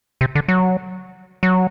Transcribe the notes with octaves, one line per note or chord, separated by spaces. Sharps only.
C3
D3
F#3
F#3